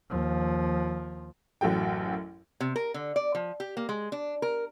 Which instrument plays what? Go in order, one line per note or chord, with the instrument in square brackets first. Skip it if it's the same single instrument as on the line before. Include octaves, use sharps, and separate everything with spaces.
[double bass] D#2 F3
[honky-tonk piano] A1 F#2 F#3 F#4 A4 G5
[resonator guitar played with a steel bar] C3
A#4
D3
D5
F3
G4
A#3
G#3
D4
A#4